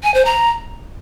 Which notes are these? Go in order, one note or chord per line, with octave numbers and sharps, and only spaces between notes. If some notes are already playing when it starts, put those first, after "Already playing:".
G#5
C5
A#5